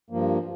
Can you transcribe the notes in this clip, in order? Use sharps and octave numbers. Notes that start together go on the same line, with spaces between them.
G2 F3 A#3